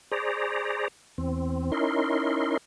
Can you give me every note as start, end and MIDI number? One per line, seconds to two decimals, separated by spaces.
0.12 0.88 68
0.12 0.88 72
0.12 0.88 74
0.12 0.88 82
1.18 1.71 40
1.18 1.71 60
1.72 2.57 61
1.72 2.57 63
1.72 2.57 64
1.72 2.57 70
1.72 2.57 84